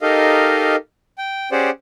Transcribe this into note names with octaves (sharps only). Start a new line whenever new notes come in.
D#4 G4 A4 A#4 D#5 F5
G5
C#4 G4 G#4 C5 D5 F#5